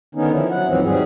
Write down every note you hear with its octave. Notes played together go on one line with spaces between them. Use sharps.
D3 D#3 B3 C#4 D#4
F3 E4
F#3 F#5
D#2 G#2 E3 F3 C4
G#2 F#3 G3 G#4